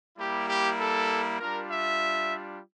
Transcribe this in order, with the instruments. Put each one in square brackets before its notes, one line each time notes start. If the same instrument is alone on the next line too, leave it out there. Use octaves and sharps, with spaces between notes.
[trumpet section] G3 A#3 E4 G4
G4
A4
G3 D4 F4 A#4
E5